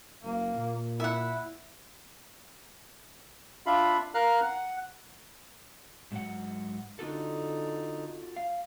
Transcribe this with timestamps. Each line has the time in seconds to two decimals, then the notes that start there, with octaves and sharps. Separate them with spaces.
0.23 F#1 A#3
0.55 A#2
1.00 E4 E5 F#5
3.66 D4 F4 E5 F5 B5
4.14 A#4 F5 A#5 F6 F#6
4.43 F#5
6.12 G#2 F#3 F#5
6.99 D3 D#4 F4 F#4 A4
8.36 F5